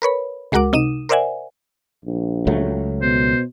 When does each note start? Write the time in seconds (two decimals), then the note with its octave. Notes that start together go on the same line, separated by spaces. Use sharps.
0.02 A#4 B4 C#5 B5
0.52 C#2 G#3 F#4 A#4 F#5 D6
0.73 C3 D#4 D#6 D#7 E7
1.09 A#4 C5 D5 E5 F#5 G#5
2.05 A#1
2.47 C#2 F#3 A3
3.02 B2 C5